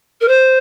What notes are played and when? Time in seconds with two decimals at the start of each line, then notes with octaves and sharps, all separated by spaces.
0.21 A#4
0.28 C5